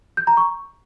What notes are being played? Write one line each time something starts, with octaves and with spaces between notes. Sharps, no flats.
G6
A#5
C#6